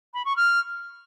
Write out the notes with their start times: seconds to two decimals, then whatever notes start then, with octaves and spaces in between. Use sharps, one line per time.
0.14 B5
0.25 C#6
0.37 F6